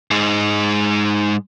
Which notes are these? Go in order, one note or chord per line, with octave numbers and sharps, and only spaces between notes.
G#2 G#3